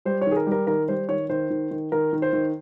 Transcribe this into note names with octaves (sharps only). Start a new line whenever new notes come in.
G3 C5
C#5
D#3 G#4
A#4
G3
A#4
D#3 A#4
G3 C5
D#3 C#5
D#3 C5
D#3
D#3
D#3 A#4
D#3
C5
D#3